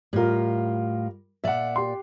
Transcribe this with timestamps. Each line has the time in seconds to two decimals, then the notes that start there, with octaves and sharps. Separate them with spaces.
0.13 A2 G3 F4 A#4
1.44 A#2 D5 E5 F#5
1.76 G4 C6